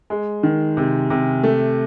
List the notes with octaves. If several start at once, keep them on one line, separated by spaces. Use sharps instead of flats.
G#3
D#3
C3
C3
A3